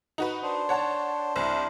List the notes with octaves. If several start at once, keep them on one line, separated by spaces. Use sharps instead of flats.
D#4 F#4 B4
D4 C5
C#5 F#5 A5
C2 D4 E4 C5